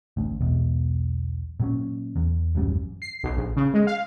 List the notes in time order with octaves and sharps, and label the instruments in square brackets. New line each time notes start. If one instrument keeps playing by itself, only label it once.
[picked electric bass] A1 D2
E1 B1 E2
A#2 F#3 C#4
E2
D#1 A1 F#2 G3
[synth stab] C7
B1
A#1
C#3
G#3
F5